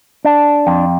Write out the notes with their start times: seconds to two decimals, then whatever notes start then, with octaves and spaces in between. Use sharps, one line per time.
0.25 D4
0.67 F2